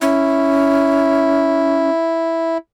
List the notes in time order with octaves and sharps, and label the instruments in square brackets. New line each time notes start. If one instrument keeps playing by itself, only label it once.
[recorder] C#4 [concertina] E4